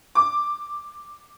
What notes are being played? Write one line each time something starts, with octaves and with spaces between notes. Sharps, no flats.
D6